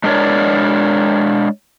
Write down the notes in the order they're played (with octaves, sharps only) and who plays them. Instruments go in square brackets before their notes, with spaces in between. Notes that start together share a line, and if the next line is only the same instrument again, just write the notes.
[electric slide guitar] G#3 A3 D4 A#4 C#5 D5